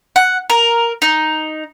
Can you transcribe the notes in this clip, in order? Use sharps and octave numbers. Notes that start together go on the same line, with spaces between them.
F#5
A#4
D#4